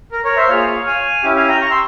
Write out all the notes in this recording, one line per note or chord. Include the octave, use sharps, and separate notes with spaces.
A#4
A#4 C#5
C5 E5
A#3 F4 G#4 C#5 F5
F5 G#5
C#4 E4 G4
F5 G#5
G5 A#5
A#5 C#6
C6 E6